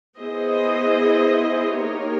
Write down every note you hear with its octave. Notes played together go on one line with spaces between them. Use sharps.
B3 E4 G#4 C5 D#5
A#3 D#4 G4 A#4 C#5